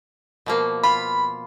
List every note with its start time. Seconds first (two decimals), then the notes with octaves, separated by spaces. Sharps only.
0.46 B2 F3 A#3
0.84 F4 B5